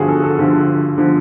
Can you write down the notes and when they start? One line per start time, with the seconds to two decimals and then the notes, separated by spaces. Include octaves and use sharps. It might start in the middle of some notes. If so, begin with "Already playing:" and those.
Already playing: G2 D3 F3 F#4 G#4
0.09 A4
0.23 A4
0.38 G2 D3 F3
0.98 D3 F3